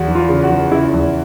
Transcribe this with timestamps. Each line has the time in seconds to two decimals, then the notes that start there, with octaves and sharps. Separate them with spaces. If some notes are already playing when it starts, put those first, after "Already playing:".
Already playing: E2 F#4
0.08 E3
0.15 F4
0.29 C#3
0.43 F#4
0.50 E3
0.71 C#3 E4
0.94 E2